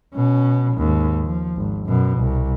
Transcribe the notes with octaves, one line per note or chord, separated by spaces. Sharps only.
B2 C#4
D#2 G#2
F3
G#1
F#2 B2
C2